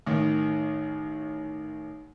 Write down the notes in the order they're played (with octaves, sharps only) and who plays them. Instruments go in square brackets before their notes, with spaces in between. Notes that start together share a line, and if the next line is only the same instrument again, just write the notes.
[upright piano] A1 D#3